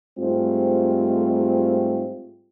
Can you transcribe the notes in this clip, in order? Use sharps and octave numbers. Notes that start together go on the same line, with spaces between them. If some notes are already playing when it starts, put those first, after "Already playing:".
G#2 G3 A3 C4 F4